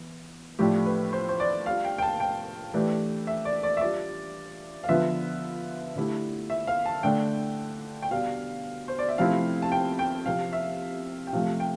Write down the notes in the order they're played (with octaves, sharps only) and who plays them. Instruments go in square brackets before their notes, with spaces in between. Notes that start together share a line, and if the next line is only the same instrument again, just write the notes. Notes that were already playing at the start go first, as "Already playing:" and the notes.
Already playing: [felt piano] E3 B3
[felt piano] A2 F3 A3 D4 [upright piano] G4
[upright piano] B4
C5
C5
D5
[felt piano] G3 D4 F4 [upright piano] F5
[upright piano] G5
G5
A5
G5
[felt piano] E3 A3 D4 G4
[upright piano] E5
D5
D5
E5
[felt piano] G3 D4 F4 [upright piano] D5
[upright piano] F5
[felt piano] D3 F3 B3 F4 [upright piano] E5
[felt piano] D3 A3 E4 G4
[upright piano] E5
F5
A5
[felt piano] D3 A3 D4 [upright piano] G5
[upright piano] G5
[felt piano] B2 G3 D4 [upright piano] F5
[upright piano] C5
D5
E5
[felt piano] C3 F3 A3 C4 E4 [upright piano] F5
[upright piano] A5
G5
G5
[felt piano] C3 F3 C4 G4 [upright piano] F5
[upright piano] E5
G5
[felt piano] C3 F3 A3 [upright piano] F5
[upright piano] G5